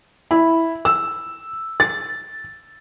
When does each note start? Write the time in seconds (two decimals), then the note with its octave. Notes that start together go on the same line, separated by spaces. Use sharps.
0.31 E4
0.85 E6
1.80 A6